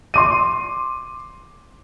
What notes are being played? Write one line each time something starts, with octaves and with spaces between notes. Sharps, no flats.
C6 D6 D#7